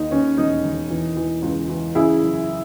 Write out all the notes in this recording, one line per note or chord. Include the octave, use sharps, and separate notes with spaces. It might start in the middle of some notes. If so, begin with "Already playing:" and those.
Already playing: D#2 D#4
D#2 C#4
E1 D#4
E1
E3
E3
C#2
E3
C#3 E4 G#4
F#1